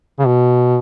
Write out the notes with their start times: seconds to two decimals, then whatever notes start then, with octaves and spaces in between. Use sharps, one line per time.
0.20 C#3
0.27 B2